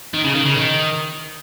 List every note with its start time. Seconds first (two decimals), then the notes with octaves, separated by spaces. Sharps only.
0.14 D#3
0.24 C#3
0.35 D#3
0.45 C#3
0.56 D#3